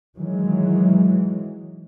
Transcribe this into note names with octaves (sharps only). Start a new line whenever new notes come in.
D#3 E3 F#3 G#3